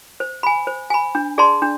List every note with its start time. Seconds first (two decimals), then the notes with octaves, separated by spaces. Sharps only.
0.20 C5
0.43 G#5 B5
0.67 C5
0.90 G#5 B5
1.15 D4
1.38 G#4 D5 A5 C6
1.62 D4